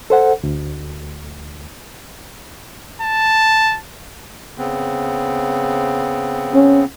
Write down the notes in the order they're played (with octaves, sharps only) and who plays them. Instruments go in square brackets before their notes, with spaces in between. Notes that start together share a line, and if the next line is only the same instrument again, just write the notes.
[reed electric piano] A4 C5 F#5
D2
[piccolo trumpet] A5
[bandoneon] C#3 B3 C4
[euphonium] C#4